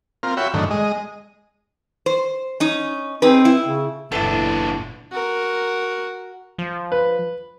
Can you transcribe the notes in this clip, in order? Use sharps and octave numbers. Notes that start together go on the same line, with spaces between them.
C4 F4 A#4
F#4 C#5 E5 G5 B5
F#2 A2 D3 D#3
G#3 D#5
C5
C#4 D#4
C4 D#4 G#4 B4
E4
C#3
F#1 E2 A#2 B3 D4 E4 A4
F#4 A#4
F3
B4